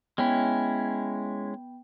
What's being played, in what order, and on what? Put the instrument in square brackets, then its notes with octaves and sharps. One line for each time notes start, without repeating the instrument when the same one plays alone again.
[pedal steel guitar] G#3 C#4 E4 [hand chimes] B3 G5 B5